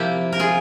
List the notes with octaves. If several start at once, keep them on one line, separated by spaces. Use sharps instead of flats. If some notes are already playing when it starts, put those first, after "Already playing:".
Already playing: C3 F3 A#3 E4 G4
A#4
F4 G#4